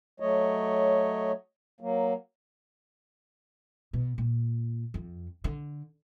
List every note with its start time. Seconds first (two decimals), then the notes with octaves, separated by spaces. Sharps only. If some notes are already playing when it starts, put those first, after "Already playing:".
0.20 F#3 A3 C#5 D#5
1.81 F#3 A#3
3.93 B2
4.18 A#2
4.94 F2
5.44 D3